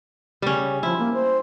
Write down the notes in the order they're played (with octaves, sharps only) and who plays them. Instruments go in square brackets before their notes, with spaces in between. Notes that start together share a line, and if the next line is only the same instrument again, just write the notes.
[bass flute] C#3 [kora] G3 C#4
[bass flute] F3 [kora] E4
[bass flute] A#3
C5